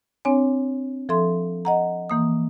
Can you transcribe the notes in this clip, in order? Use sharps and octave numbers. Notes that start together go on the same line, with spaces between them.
C4 D4 C#5 G#5
F3 A4 E5 C6
D#5 F#5 A#5
E3 A#3 D#6